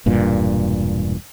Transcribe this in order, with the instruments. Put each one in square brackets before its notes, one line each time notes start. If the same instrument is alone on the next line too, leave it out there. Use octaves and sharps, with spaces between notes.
[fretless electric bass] E1 G2 A#2